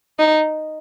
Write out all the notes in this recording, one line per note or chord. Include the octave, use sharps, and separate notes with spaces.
D#4